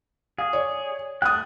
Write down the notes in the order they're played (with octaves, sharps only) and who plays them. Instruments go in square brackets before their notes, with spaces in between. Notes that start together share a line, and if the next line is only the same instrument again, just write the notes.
[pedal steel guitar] G#4 [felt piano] F5
[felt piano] C#5 D5
[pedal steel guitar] A3 F#6 [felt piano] G5 D#6